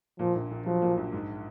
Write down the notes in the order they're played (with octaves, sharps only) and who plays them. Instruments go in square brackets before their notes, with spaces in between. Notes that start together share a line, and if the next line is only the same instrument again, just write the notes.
[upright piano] A#2 [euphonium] F3
[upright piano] A#1
A#1
[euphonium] F3 [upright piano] F#3
[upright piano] A#2
A#1
G#2